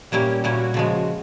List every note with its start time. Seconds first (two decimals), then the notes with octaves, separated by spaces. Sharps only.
0.12 A#2 G3 A#3 C#4 E4 G4
0.44 A#2 G3 A#3 C#4 E4 F#4
0.74 C#3 F3 G#3